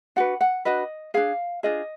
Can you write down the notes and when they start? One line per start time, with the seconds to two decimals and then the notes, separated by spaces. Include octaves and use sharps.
0.16 D4 F#4 B4 F#5
0.41 F#5
0.65 D4 F#4 B4 D#5
1.14 D4 F4 G#4 F5
1.63 D4 F4 G#4 D#5